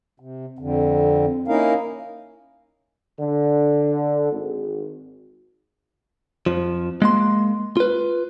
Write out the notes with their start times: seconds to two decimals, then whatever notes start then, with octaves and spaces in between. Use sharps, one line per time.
0.20 C3
0.59 F2 D3
1.48 A#3 C#4 D#4 E4 A#4 F5
3.19 D3
4.32 G#1
6.46 F2 F3
7.02 G#3 A#3 C6
7.77 F4 B4